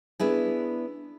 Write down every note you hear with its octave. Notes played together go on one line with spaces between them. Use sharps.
B3 D4 E4 G#4